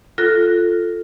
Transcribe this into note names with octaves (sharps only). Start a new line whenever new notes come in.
F4 A4 F#6 A#6